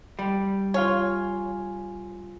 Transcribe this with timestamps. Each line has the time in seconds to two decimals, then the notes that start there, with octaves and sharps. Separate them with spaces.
0.19 G3
0.74 F4 C#5 F5 G#5